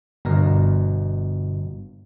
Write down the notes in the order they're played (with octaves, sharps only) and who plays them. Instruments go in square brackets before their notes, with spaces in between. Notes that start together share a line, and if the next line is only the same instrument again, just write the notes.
[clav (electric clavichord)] G1 B2 A#4